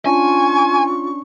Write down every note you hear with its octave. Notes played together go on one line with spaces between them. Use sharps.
C#4 D4 F4 G#5 C#6